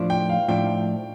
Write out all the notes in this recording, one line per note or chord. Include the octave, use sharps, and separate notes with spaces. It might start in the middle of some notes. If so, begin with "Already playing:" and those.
Already playing: A2 F3 D4
G5
F5
A2 F3 D4 G5